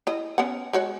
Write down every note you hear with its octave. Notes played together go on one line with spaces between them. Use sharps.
E4 D#5
B3 C#4 F#5
G#3 F#4 C#5